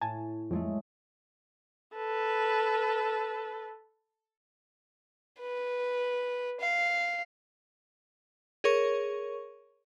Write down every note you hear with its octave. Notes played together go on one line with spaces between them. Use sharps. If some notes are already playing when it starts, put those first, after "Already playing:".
A2 G#5 A5
F2 F#3 G#3 A3
A4 B4
B4
F5
G#4 A#4 C#5 C#6